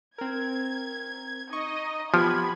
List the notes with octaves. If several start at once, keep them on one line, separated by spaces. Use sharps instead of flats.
C4 A#4 G#6
D#4 D#5 C#6
F3 B3 G4 B5 G#6